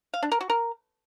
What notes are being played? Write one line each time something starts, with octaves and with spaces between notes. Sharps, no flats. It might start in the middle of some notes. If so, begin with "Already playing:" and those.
F5
D4
A#4
F#4
A#4